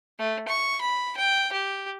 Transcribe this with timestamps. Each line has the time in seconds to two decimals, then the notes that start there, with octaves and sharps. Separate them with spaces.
0.19 A3
0.48 C#6
0.81 B5
1.17 G5
1.53 G4